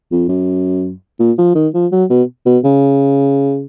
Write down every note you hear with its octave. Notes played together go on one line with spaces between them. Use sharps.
F2
F#2
A#2
F3
D#3
F3
F#3
B2
B2
C#3